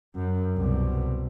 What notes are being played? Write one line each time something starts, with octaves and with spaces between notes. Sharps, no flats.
F#2
C2 B2